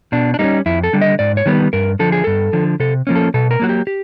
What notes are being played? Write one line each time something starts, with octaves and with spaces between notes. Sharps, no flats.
B2 D4
D4
G3 A#3 C#4 D#4
F2 E4
A4
D3 G3
D#5
G#2 D5
C#5
D#3 G3 B3
G2 A#4
D3 F3 A4
G#4
G2 A4
D3 F3
C3 A4
F3 A#3 C#4
A4
B2 A4
A#4
F#3 A#3 F#4
G4
G4